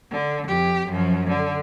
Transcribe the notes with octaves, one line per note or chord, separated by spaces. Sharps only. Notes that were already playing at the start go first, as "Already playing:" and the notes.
D3
F2 G4
F#2 F3
D3